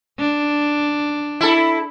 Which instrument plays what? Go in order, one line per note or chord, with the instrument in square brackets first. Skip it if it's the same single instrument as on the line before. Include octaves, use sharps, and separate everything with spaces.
[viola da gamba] D4
[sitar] E4 A4